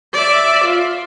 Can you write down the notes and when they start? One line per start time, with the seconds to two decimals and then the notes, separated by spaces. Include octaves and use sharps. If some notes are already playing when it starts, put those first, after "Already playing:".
0.14 D5 E5
0.64 F4